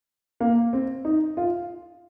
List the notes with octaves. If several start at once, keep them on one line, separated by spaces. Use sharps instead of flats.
A#3
C4
D#4
F4